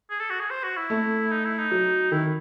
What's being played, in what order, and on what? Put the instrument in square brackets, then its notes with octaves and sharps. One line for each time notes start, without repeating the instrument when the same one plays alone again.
[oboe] G#4
A4
F#4
G#4
C5
F#4
E4
[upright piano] A3
[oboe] D#4
E4
D#4
[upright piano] F#3
[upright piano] D#3 [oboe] E4